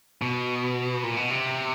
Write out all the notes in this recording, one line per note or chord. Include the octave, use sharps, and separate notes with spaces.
B2
A#2
B2
C3